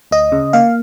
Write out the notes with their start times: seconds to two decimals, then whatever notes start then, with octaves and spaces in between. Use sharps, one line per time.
0.11 D2 D#5
0.32 C#3
0.53 A#3 F5